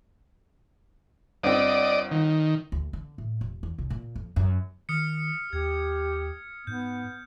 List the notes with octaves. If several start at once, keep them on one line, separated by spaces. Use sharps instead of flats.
G1 C4 D5 D#5
D#3
D2
D3
A2
E1
E2
C2
A#2
F2
F#2
D#3 D#6 F6 C#7
D#2 G4 G#6
G#2 B3 G6